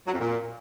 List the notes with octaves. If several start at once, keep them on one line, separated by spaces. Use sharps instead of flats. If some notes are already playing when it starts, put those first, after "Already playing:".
F#3
F2
A#2